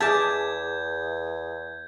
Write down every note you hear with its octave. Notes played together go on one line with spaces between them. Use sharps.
E2 G#4 E5 A5 D6 G6 G#6